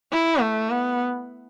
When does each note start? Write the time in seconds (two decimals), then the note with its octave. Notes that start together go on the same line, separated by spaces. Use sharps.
0.12 E4
0.41 A3
0.70 B3